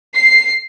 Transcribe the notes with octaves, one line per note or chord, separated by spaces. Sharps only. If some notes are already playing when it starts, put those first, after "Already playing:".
C7